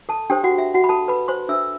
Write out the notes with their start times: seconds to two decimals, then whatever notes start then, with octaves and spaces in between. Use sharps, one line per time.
0.09 A4 A5
0.30 D4 G4 A4 C5 G5
0.44 F#4 F#5
0.58 E5
0.74 F#4 F#5
0.84 B5
0.89 A4 A5
1.08 B4 B5
1.28 C5 C6
1.49 D4 A4 C5 E5 E6